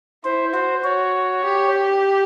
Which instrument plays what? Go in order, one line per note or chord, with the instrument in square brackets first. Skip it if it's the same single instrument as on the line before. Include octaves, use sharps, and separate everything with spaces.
[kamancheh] E4 [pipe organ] C5
[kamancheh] F#4 [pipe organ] C5
[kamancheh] F#4 [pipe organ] C#5
[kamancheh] G4